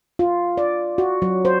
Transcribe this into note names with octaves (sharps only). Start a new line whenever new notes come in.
F4
D5
F#4
F#3
C5